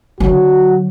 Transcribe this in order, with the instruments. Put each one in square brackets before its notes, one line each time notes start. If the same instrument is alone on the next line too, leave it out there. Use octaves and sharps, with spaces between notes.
[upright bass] D3 F#3 [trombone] F#4